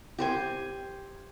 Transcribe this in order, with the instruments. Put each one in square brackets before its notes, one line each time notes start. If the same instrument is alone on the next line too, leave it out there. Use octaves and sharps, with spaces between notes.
[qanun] G4 C5 G#5